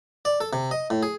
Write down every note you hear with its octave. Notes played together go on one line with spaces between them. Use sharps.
D5
A4
C3
D#5
A2
G#4